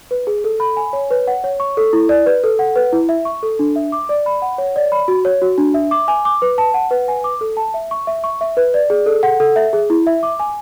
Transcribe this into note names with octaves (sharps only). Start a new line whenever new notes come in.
B4
G#4
A4
B5
G#5
C#5
B4
F#5
C#5
C#6
A4
E4
D5
B4
A4
F#5
B4
E4
E5
C#6
A4
D4
E5
D6
D5
B5
F#5
C#5
D5
B5
F#4
C#5
F#4
D4
E5
D6
G#5
D6
B4
A5
F#5
B4
G#5
D6
A4
A5
E5
C#6
E5
C#6
E5
B4
D5
G#4
A4
F#5
A4
E5
G#4
E4
E5
D6
G#5